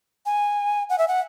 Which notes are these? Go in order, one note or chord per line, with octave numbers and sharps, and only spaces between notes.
G#5
F#5
E5
F#5